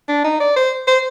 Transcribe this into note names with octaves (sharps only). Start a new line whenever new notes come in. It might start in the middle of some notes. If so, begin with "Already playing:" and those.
D4
D#4
D5
C5
C5